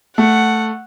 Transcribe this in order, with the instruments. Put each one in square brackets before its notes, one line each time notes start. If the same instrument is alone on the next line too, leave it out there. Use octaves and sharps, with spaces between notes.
[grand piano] A3 [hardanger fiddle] F#5